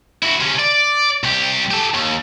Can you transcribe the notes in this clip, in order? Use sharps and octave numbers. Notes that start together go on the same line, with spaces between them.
E4 F#4
C3 C#4
D5
C2 G4
G4 A4
D#2